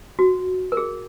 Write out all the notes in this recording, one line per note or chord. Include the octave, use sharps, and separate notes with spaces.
F#4
A#4
G#4